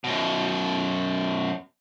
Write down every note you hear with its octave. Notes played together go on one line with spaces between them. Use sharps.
F#2 B2